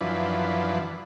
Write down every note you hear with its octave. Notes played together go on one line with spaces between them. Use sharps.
F#2 E3 F3 D4 B4